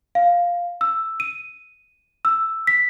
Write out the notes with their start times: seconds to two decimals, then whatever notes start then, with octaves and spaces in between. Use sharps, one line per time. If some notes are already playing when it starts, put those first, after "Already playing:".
0.15 F5
0.81 E6
1.20 D#7
2.25 E6
2.67 B6